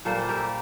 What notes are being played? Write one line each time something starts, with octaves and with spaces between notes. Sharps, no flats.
A#2 G3 A#3 A4 C5
G4 A#4